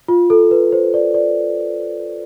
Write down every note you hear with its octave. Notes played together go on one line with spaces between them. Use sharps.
F4
A4
B4
C5
D5
D5